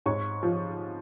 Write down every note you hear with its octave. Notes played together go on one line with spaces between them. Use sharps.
G#2 C#5 C#6
F3